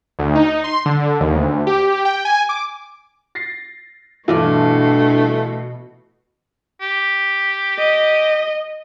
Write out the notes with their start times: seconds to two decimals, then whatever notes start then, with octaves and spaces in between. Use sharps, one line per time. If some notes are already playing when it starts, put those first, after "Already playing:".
0.19 D2
0.35 D#4
0.64 C6
0.86 D3
1.20 D#2
1.35 D2
1.67 G4
2.05 G5
2.25 G#5
2.49 D6
3.35 A6 A#6 C7
4.28 E2 G2 B2 E3 A3 D4 E4 F4
6.81 G4
7.78 D#5